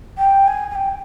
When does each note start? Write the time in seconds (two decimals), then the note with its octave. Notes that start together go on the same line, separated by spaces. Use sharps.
0.18 G5
0.47 G#5
0.70 G#5
0.75 G5